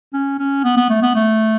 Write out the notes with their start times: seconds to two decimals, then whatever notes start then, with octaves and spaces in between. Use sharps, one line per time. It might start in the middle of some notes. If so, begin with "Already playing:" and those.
0.13 C#4
0.39 C#4
0.64 B3
0.77 B3
0.90 A3
1.02 B3
1.15 A3